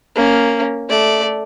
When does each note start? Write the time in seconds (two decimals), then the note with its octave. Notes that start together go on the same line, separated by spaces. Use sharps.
0.15 A#3 C#4
0.88 A3 D5